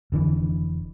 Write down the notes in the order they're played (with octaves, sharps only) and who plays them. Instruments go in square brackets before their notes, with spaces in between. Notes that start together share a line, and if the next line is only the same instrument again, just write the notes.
[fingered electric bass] F1 D3 E3